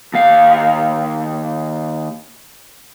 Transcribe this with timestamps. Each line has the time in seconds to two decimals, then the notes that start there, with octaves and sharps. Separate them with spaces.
0.14 D#2 F5